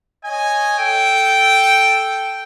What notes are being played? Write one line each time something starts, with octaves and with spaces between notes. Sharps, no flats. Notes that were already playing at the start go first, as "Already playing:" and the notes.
C#5 D#5 G#5
A4 G5